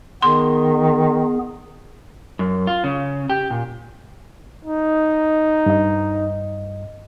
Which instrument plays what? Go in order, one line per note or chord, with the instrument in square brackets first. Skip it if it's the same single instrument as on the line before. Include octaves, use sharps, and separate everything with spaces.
[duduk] D#3 [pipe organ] B3 G#4 [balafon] C6
[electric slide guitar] F#2
F4
C#3
G4
A#2
[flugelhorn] D#4
[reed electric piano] G2 D#5